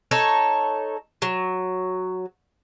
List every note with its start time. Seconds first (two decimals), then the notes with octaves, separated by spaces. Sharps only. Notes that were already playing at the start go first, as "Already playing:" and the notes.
0.11 D#4 A4 C#5
1.22 F#3